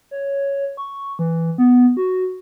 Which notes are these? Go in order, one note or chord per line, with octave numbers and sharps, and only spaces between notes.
C#5
C#6
E3
B3
F#4